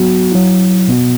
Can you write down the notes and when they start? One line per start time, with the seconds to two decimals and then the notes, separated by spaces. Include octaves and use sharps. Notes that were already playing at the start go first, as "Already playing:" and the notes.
Already playing: F#3 B3 F#4
0.32 F#3 E4
0.88 B2 B3 F#4